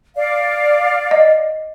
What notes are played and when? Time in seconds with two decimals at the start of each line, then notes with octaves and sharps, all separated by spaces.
0.16 D5 F5
1.11 D#5